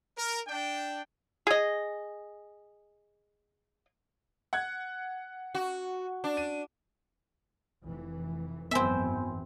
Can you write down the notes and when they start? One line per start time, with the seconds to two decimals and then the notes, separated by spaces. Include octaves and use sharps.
0.18 A#4
0.47 D4 G5
1.47 G#4 D#5
4.53 F#5 F#6 G#6
5.55 F#4
6.24 D4
6.37 D#7
7.84 F1 E3
8.71 G#1 F#2 E3 B3 C4 E5 G#5 B5